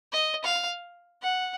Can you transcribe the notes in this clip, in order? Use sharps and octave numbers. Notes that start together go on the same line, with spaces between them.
D#5
F5
F#5